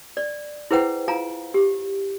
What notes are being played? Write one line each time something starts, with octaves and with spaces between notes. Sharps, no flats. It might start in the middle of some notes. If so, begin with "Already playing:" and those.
D5
E4 G#4 B4 C5 F#5 G5
F4 F5 G#5 A#5
G4